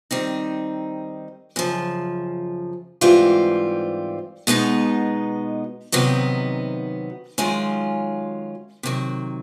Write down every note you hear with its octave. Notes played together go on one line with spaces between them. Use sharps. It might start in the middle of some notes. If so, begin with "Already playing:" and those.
D#3 G3 C4 D#4
F#2 C#3 F3
G#2 E3 G3 C4 F4
B2 G#3 B3 D#4
C3 D#3 F#3 B3 D#4
F#2 D#3 G#3 C#4 F4
C3 D#3 F#3